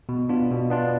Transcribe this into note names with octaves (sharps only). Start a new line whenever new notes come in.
B2
B3 D4 F4
B2
B3 D4 F4